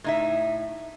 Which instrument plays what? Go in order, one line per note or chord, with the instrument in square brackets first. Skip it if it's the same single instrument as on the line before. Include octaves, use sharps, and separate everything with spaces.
[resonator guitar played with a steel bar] A2 D#4 E5